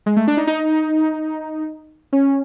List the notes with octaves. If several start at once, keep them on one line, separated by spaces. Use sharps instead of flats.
G#3
A3
D4
D#4
D#4
C#4